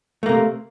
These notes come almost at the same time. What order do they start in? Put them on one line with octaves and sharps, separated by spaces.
A3 A#3 C3